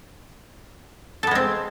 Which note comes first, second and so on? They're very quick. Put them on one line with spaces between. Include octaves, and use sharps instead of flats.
A4 B3 G#3 C4